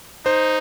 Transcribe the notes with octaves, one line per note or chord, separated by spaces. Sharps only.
D#4 C5